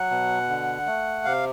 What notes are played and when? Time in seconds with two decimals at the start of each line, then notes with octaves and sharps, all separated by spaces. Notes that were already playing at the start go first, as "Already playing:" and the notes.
Already playing: F#3 F#5
0.11 B2
0.48 D3
0.87 A3
1.25 C3 F5